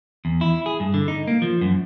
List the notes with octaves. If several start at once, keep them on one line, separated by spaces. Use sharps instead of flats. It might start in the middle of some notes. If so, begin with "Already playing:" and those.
E2
E4
G#4
G2
D3
D#4
A#3
F3
F#2